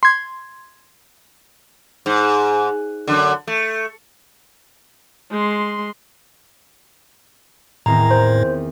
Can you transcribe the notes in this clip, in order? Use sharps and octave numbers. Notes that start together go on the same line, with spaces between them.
C6 G#6
G#2
F#2 D3
A3
G#3 C6
E2 A2 D#3 C4 A#5
C5